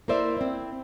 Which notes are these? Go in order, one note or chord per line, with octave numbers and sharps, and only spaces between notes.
A#3 E4 A#4 C5 D5 E5
C4 E4